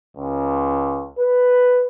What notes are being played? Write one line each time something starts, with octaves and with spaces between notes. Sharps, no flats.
C#2
B4